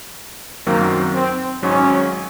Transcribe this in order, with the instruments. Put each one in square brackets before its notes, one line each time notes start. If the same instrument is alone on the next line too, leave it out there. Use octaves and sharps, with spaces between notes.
[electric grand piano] F#2 D#3 F#3 C4 [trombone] A#3
[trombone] C4
[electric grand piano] G#1 G#2 F#3 [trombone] C#4